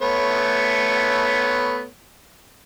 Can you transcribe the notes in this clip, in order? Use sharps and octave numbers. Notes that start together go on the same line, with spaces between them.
A3 B3 C#5